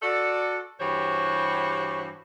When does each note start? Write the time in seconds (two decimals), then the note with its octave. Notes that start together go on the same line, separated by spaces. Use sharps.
0.02 F#4 A4 D5
0.80 G2 E3 F#4 G4 C5 C#5